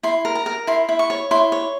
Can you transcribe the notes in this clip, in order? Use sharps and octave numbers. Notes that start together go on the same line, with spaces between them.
E4 C6
A#4
A#5
A#4
E4 C6
E4
C#6
C#5
E4 C6
C#5